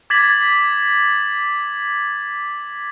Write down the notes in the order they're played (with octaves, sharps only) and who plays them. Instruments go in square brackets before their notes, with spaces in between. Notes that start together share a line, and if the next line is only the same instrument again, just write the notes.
[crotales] D6 G#6 A6 B6 F#7